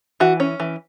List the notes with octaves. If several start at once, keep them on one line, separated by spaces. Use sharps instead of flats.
E3 F#4
C#4
E3